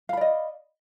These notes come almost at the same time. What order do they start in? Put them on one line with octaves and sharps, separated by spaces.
F5 B5 D5 D#5